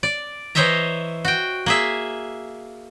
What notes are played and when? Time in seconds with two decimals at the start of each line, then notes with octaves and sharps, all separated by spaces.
0.03 D5
0.55 E3 C5 C#5 D#5 E5 A#5
1.25 F#4 G5
1.66 A#3 G#4 E5